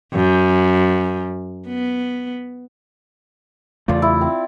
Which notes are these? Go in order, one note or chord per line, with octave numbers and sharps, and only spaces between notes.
F#2
B3
E2 C#3 A3 F4 D5
E4
C4